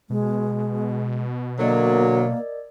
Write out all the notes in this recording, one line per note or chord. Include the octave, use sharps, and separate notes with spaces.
B2 G#3
D3 F#3 A#3 A#4 D5 D#5